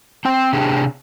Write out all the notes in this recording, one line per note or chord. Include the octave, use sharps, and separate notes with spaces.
C4 G5
C3 D4 G4 G#4